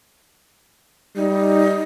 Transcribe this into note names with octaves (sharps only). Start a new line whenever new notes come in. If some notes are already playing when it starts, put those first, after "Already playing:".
G3 D#4